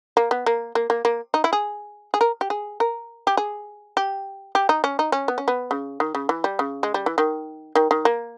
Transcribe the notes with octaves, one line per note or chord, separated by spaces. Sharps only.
A#3
B3
A#3
A#3
A#3
A#3
D#4
E4
G#4
G#4
A#4
G4
G#4
A#4
G4
G#4
G4
G4
D#4
C#4
D#4
C#4
B3
C#4
B3
C#3
D#3
C#3
E3
G3
C#3
G#3
G3
E3
D#3
D#3
D#3
A#3